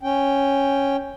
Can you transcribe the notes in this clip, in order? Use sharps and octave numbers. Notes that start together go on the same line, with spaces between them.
C#4 G5